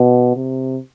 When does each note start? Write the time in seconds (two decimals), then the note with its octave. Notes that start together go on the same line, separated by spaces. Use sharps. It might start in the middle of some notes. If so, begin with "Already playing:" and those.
Already playing: B2
0.36 C3